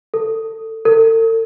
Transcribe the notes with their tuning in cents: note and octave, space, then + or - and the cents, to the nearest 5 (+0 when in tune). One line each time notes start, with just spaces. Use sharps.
A4 +20
A4 +45